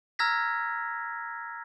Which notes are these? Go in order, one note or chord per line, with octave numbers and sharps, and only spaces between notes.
A#5 E6 F6 G#6 A#6 B6